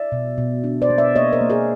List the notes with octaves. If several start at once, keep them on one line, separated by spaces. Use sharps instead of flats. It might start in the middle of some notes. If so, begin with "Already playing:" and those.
Already playing: D5 E5
B2
B2
D4
C5 D5
B3
D5 E5
A#3 C#5 D#5
A#4 C5
A#3
G#4 A#4